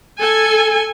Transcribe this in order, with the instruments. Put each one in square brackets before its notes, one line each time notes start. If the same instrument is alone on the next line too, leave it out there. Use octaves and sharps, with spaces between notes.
[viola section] A4 G#5